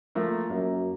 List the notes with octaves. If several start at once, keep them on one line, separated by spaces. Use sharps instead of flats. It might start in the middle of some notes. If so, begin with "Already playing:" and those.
F3 A3 A#3
F#2 A#3